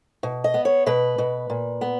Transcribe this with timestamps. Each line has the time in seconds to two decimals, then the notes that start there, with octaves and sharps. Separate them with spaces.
0.23 B2
0.44 D#5
0.54 B3
0.65 C#5
0.86 B2 B4
1.18 B2
1.50 A#2
1.81 B3